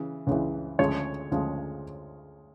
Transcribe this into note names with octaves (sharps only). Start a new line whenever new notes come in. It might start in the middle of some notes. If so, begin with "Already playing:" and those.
Already playing: C#3 E3
C#2 C#3 E3
D2 C#3 F3 G#3 C#5
D2 C#3 F3 G#3